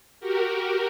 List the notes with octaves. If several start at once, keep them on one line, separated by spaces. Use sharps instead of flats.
F#4 G4 A#4